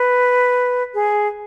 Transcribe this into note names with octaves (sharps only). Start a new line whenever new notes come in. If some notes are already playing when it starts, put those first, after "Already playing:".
Already playing: B4
G#4